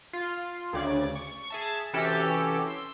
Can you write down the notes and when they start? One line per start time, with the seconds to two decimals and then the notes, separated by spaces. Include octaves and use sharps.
0.13 F4
0.73 D2 C#3 D5 D6 G#6
1.15 C#6
1.50 G#4 E5 A5
1.93 C3 E3 C#4 F#4 G4 A4
2.68 C6 E6